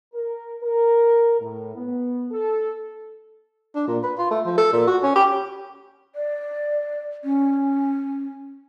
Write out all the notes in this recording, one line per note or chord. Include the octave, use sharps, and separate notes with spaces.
A#4
A#4
A2
B3
A4
D4
A#2
B4
F4
A3
F3
A4
A#2
F#4
C#4
G4
D5
C#4